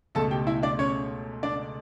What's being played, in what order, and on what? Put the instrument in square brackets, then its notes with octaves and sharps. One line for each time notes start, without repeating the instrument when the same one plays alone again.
[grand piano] C#2 B2 A3 A4 A5
G4 G5
E4 E5
D4 D5
C#4 C#5
D4 D5